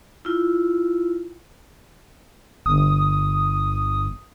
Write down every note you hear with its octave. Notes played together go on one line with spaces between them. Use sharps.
E4 F4
G1 D#6